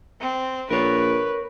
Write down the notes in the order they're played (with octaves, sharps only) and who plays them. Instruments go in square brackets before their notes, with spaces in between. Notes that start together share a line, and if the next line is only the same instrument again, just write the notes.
[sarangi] C4
[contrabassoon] A#1 [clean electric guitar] A#4 C#5 [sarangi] B4